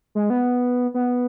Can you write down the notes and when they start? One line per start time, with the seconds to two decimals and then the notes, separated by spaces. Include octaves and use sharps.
0.15 G#3
0.30 B3
0.94 B3